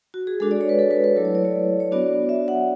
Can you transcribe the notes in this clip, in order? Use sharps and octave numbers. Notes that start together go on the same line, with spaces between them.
F#4
G#4
G#3 D4 F#4 A4
D5
C#5
B4
A4
B4
B4
F#3 A3 E4 A4
C#5
D5
C#5
C#5
B3 D4 F#4 D5
E5
F#5